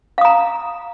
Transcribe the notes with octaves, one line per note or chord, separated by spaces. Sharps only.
F5 A#5 D#6